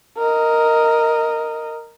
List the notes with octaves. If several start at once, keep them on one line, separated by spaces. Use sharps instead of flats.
A#4 D#5